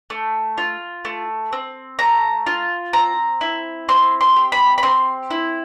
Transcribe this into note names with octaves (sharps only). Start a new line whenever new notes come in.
A3
F4
A3
C4
A3 A#5
F4
C4 A#5
E4
C4 C6
C6
G4
B5
B5
C4 C6
E4